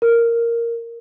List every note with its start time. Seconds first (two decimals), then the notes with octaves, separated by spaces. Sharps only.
0.02 A#4